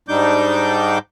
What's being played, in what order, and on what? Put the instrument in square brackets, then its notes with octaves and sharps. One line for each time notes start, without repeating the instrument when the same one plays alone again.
[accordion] G#2 G3 D4 D#4 D6 G6